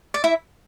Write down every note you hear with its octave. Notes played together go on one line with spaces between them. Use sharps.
D5
E4 E5